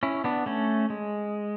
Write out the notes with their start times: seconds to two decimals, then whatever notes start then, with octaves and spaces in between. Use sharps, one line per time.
0.03 C#4 E4
0.24 B3 D4
0.46 A3 C#4
0.90 G#3